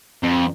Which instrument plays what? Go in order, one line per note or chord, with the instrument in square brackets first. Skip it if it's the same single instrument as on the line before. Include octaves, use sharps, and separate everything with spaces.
[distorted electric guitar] F2